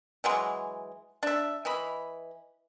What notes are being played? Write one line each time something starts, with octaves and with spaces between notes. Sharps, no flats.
E3 F#3 G#3
D4 E5
E3 D#5 B5